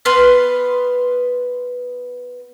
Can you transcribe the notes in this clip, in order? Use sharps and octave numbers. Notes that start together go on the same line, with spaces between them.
B3 B4 C6 F6